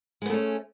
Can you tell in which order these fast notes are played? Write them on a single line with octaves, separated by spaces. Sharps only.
G#3 B3 A3 C#4